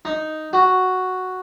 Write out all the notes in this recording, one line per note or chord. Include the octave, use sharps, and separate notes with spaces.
D#4
F#4